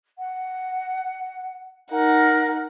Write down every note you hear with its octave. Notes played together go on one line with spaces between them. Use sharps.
F#5
D#4 A#4 F#5